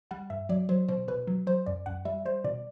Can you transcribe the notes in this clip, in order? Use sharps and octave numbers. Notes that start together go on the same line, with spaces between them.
G3 F#5
G2 E5
F#3 D5
F#3 C5
B2 C5
B2 B4
F#3
F#3 C5
F#2 D5
F#2 F#5
G3 E5
G3 C5
B2 D5